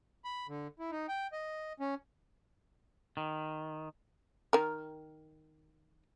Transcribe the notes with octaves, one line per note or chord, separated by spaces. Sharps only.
B5
D3
E4
D#4
G5
D#5
C#4
D#3
D#3 A#4